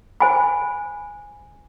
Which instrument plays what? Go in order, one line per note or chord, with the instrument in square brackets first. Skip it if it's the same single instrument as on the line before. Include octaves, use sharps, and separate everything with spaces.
[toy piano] C5 G#5 B5